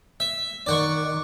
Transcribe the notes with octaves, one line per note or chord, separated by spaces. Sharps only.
E5
D#3 D5 F#5 C#6